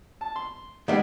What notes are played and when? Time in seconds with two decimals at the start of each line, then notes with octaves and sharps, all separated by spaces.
0.21 A5
0.36 C6
0.88 D#3 G3 G#3 B3 E5